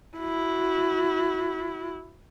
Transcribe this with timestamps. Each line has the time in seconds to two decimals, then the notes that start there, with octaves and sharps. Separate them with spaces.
0.18 E4 F#4